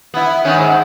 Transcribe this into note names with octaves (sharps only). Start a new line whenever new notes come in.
B3 E4
D#3 B3 C#4
G#2